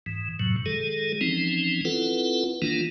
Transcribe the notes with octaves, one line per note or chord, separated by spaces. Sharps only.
G#2 E3
F#2 A2 C3 F#3
D#3 G#3 G#4 A4
E3 F3 C4 C#4 D#4
C4 E4 F4 A4 B4 F#5
D#3 E3 A#3 D4 F4